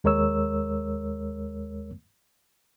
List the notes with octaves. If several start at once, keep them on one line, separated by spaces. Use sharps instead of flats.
D#2 G#3 A#4 C#5 E6